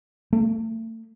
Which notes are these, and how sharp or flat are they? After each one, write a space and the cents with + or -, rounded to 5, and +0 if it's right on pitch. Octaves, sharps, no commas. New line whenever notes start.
A3 +35